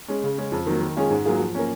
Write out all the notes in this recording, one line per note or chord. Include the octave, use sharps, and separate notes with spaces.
G#3 C#4
C#3
G#3 C#4
F2
D#3 F#3 A#3
D#3
G#3 C#4 F4 G#4
G#2
F#3 A#3 F4 G#4
F3
A#3 C#4